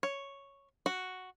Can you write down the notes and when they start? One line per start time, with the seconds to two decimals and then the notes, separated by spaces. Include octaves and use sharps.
0.03 C#5
0.86 F#4